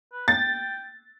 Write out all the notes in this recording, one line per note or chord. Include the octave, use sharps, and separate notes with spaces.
B4
G5 A6